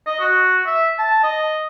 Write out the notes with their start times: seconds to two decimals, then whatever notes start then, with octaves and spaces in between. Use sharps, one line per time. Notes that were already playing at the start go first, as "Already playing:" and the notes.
0.06 D#5
0.20 F#4
0.66 E5
0.98 A5
1.23 D#5